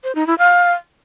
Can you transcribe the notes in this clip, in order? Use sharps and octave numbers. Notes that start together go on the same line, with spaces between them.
C5
D#4
E4
F5